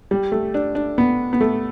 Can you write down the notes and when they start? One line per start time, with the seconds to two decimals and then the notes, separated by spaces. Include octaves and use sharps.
0.11 G3
0.32 A3
0.54 D4
0.75 D4
0.98 B3
1.33 B3
1.41 A3